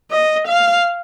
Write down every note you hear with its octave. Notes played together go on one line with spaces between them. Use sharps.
D#5
F5